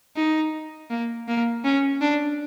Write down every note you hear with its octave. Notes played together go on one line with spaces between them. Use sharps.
D#4
A#3
A#3
C#4
D4